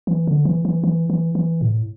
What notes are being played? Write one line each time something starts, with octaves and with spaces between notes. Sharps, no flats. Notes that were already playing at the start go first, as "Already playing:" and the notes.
E3
D3
E3
E3
E3
E3
E3
A2